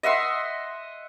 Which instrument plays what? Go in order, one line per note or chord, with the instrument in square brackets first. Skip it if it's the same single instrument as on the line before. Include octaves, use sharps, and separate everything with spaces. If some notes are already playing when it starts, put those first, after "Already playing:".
[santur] D#5 E5 F#5 C6